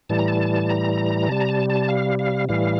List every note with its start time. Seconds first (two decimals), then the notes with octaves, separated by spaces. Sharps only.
0.09 A2 E3 G3 A5
0.19 A#5
0.28 A5
0.69 A#5
1.29 C3 G3 A5
1.40 A#5
1.49 A5
1.70 A5
1.88 F5
2.19 F5
2.49 A2 E3 G3 F5